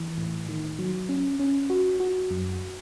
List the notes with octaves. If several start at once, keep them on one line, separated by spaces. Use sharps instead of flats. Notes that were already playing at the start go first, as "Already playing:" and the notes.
Already playing: E3
A2
D#3
F#3
C#4
C#4
F#4
F#4
F#2